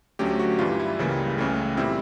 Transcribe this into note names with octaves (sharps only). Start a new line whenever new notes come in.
D2 D3 F#3 A3 C#4 G4
F#4
G2 E3 G3 F4
E4
C#2 C#3 E3 G3 A#3
C#2 C#3 E3 A3
A#2 G3 C4 E4